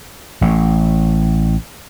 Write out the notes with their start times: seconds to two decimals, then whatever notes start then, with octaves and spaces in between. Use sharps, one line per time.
0.41 A1 A2